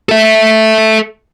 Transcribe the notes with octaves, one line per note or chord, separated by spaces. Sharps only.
A4 E5